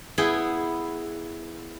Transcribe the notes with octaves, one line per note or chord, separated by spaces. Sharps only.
B3 E4 G#4 G5